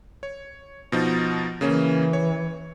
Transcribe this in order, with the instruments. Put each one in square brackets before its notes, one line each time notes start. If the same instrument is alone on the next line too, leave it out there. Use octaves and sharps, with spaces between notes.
[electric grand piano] C#5
B2 F3 D#4
[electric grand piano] C#3 A#3 C#4 [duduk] E3
[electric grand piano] C#5